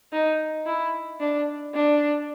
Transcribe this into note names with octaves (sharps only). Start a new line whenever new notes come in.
D#4
E4
D4
D4